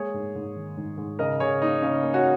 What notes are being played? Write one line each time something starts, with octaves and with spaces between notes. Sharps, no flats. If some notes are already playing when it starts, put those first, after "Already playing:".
Already playing: G#3 A#3 G#4 C#5
G#2
G#2
D#3
G#2
G#2
C#3 A#4 D#5
C#3 G#4 C#5
A#3 D#4
C#3 C#4
A#3
C#4 F#4